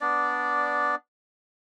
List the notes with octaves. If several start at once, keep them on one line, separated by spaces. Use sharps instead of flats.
B3 D4 D5